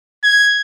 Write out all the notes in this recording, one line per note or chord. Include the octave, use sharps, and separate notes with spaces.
G#6